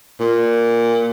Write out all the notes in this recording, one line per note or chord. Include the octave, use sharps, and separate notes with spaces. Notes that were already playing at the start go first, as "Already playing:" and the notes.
A#2